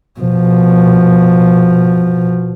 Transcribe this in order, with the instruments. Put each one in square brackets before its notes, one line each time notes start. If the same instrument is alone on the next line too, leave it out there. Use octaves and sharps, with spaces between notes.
[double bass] B2 F3